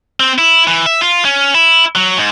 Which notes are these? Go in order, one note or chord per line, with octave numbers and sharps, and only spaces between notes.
C4
E4
E3
E5
F4
C#4
E4
F#3
G#2